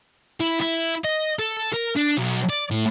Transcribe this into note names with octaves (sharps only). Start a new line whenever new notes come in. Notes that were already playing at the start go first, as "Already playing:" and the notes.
E4
E4
D#5
A4
A#4
D4
B1
D5
A2